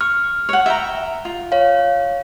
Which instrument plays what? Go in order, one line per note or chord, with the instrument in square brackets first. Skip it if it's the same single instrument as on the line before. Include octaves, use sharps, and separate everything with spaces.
[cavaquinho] C#6 [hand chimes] F6
[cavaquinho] C#5 F#5
E5 G5 A#5
F4
[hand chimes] C#5 F5